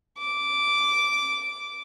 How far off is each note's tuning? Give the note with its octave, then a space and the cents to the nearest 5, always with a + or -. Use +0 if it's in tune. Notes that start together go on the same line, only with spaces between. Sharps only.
D6 -10